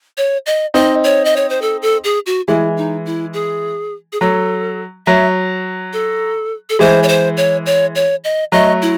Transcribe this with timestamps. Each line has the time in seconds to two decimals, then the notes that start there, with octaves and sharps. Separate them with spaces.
0.17 C#5
0.46 D#5
0.74 C4 D#4 D#5
1.04 C#5
1.25 D#5
1.36 C#5
1.49 C5
1.62 A4
1.82 A4
2.04 G#4
2.26 F#4
2.48 E3 G#3 E4
2.77 D#4
3.06 E4
3.33 G#4
4.12 G#4
4.20 F#3 A4
5.06 F#3 E5
5.93 A4
6.69 A4
6.79 E3 G#3 C5
7.03 C#5
7.08 C5
7.37 C#5
7.66 C#5
7.95 C#5
8.24 D#5
8.52 F#3 A3 D#5
8.82 E4